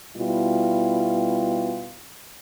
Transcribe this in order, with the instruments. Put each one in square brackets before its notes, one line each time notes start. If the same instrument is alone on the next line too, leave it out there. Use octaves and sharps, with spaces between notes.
[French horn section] B2 G3 E4 F4